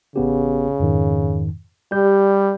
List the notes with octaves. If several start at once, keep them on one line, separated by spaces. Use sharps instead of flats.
A1 C#3 B3 G4
F2 G#2 D#3
G3 G4 D5 G6